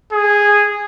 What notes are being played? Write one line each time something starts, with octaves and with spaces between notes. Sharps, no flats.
G#4